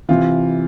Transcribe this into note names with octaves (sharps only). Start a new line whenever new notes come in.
C3 E3 F4